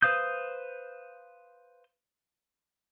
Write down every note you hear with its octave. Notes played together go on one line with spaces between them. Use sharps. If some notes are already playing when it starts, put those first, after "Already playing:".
B4 C5 F5 D#6 G6